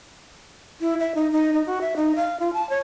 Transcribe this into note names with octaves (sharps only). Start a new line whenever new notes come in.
E4
E5
D#4
D#4
D#4
F#4
E5
D#4
F5
F4
A5
C#5